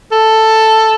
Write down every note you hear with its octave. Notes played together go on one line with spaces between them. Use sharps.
A4